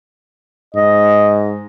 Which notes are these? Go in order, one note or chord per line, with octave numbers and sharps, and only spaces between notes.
G#2 D#5